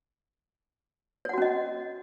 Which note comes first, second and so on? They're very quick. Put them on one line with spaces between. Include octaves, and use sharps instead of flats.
C#5 F#5 F#4 C#4 D#5